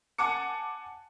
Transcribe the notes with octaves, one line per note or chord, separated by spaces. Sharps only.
F#5 G#5 A5 D6 C#7